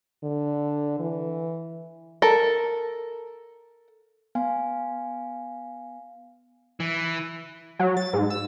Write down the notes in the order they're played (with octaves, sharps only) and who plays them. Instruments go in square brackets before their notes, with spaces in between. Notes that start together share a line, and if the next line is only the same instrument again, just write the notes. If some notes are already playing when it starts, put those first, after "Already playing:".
[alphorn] D3
E3
[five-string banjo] A4 A#4
[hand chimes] B3 F5 G#5
[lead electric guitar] E3
[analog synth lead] F#3
A6
G#2
E6